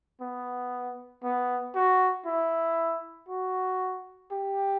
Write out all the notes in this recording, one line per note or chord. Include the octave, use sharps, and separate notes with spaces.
B3
B3
F#4
E4
F#4
G4